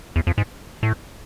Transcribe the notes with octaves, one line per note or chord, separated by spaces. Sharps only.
E2
F2
G#2
A2